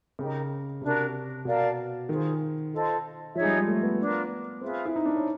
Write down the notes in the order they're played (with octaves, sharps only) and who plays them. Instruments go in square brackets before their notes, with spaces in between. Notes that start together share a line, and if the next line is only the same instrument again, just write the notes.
[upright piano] C#3 [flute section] D#4 G4 A#4
[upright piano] C3 [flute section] D4 F#4 A#4
[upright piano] B2 [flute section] A#4 D5 F5 A5
[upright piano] D#3 [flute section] F4 G#4 C5
[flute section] F4 A4 C5 D#5
[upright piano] F3 [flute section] D#4 G#4 C#5 E5
[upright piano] G3
G#3
A3
B3
[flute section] D4 F4 A#4
[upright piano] C4 [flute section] F4 G#4 B4 E5
[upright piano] E4
D#4
D4
C#4